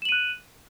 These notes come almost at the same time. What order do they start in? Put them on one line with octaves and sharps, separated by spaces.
E7 F#7 D#7 F#6